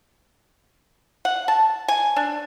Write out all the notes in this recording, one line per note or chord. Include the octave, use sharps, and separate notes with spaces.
F#5
A5
G#5
D4